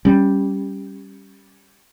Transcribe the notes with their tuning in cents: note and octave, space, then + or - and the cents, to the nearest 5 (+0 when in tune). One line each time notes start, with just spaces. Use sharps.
G3 +0 C#4 +0